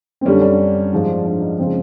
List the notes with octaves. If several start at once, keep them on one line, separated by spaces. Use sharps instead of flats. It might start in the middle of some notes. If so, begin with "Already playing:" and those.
C4
F#2 D3 G3 C#4
D4
G#2 F3 G#3
D4
D#4
C#3 F3 G#3 C4